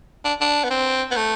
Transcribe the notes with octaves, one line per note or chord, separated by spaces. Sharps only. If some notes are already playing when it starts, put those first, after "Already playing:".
D4
D4
B3
C4
B3
A3